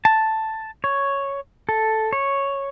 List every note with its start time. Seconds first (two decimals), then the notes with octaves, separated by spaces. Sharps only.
0.05 A5
0.84 C#5
1.69 A4
2.13 C#5